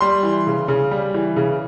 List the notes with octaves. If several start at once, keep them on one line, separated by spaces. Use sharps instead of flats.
G3 C6
E3
C#3
C#3
G3
E3
C#3